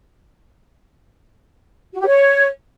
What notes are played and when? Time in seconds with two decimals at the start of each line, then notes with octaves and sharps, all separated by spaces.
1.94 F#4
2.00 G4
2.07 C#5